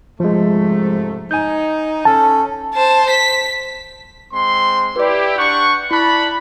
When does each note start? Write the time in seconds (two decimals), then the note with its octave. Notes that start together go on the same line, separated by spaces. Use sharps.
0.20 G#2 C3 F3 G#3 A3
1.31 D#4 G#5 G6
2.05 C#4 A4 A5
2.74 C5 A5
3.11 B6
4.33 G#3 C4 C6
4.96 E4 G4 B4 D5
5.38 D4 F#5 C#6 G6 C#7
5.91 E4 D5 A5 B5 F#6